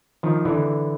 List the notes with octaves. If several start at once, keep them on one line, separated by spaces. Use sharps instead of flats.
D#3 F3
D3 E3